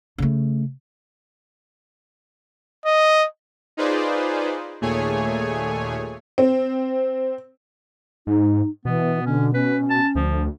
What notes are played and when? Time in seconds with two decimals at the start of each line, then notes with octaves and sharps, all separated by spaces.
0.18 C#3 A3
2.86 D#5
3.77 D#4 F4 G#4 B4 C5 D5
4.81 D#2 A#2 A3 G#4 C#5 G#5
6.38 C4
8.27 G#2 D#4
8.85 B2 E3 B3
9.26 D3 C#4
9.54 C#4 B4
9.90 A5
10.15 D2 F3